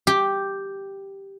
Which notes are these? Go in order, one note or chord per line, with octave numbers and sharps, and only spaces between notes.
G4